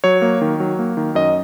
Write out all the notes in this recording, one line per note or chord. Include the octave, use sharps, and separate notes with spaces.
F#3 C#5
A#3
D#3
F#3
A#3
D#3
F#2 D#5